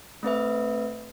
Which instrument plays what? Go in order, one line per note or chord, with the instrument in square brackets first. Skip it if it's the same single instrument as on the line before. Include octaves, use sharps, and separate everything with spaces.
[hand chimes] A3 C4 B4 E5